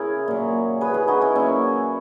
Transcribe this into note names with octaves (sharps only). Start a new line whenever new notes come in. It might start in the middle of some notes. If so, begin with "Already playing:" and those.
Already playing: C#3 E4 G#4 A#4
A#2 F#3
G#4 B4
E4 G#4
D#4 F#4
C#4 E4
A#2 F#3 C#4 E4